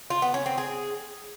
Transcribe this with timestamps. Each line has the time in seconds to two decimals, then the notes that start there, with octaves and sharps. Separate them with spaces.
0.10 F4
0.22 B3
0.34 C#4
0.46 C4
0.58 G#4